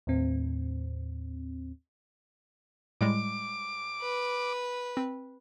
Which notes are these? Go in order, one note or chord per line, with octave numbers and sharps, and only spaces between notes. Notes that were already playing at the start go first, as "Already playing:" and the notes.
D#2 A2 C4
A2 G3 G#3 D6
B4
C4